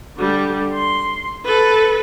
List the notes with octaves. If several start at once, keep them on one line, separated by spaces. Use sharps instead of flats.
D3 G3
C6
A4 B4